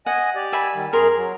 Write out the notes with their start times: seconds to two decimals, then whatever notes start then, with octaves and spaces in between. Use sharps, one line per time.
0.06 D#5 F#5 G#5
0.35 G4 D5
0.52 E5 G#5 B5
0.75 D#3 G3
0.93 F#2 G#4 A#4 C6 F6
1.16 F#3